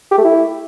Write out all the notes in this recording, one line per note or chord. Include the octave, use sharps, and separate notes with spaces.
G4
A3
E4